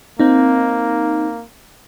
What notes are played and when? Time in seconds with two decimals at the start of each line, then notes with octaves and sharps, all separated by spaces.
0.20 A#3 C4 D#4